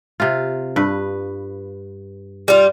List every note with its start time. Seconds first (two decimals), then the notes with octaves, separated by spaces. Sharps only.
0.20 C3 F4
0.76 G2 B4
2.48 G3 F4